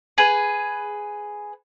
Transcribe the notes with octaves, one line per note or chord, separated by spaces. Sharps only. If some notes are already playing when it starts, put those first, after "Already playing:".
G#4 B4